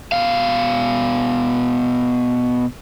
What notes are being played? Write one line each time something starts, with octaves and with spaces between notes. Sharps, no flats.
B2 F5